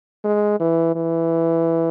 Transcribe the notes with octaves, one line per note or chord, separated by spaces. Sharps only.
G#3
E3
E3